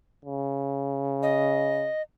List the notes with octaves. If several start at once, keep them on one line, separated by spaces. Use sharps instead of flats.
C#3
D#5